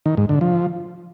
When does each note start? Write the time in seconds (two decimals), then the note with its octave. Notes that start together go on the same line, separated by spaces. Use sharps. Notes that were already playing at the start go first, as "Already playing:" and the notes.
0.06 D#3
0.17 G#2
0.29 D3
0.41 F3